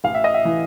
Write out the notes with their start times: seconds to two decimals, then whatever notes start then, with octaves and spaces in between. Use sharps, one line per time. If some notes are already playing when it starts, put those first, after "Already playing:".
0.04 A1 F5
0.14 E5
0.24 D#5
0.34 E5
0.45 E3